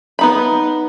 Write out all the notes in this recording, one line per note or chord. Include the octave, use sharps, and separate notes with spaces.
B3 D#4 B5